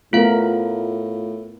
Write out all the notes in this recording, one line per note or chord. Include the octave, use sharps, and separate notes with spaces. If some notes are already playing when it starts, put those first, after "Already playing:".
A2 A3 B3 F4 A#4 F5